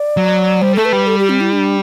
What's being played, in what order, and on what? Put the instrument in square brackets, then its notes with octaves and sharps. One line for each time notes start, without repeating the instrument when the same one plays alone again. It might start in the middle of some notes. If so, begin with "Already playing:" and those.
Already playing: [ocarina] D5
[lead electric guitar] F#3
[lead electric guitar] G3 [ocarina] C5
[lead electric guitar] A3 [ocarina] A4
[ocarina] B4
[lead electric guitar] G3
[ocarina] A4
G4
C4
E4
D4